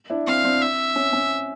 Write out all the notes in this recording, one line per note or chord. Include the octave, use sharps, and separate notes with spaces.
D4 E4
C4 F5
C4 D4
E5
C#4
C#4